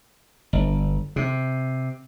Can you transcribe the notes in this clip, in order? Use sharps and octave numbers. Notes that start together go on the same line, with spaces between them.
G1
C3